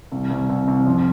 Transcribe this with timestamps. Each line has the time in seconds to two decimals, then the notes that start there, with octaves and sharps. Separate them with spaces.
0.12 C2
0.30 C2
0.49 C2
0.67 C2
0.86 F2